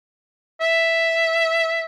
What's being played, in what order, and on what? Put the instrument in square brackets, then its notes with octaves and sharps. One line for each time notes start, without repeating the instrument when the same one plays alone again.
[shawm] E5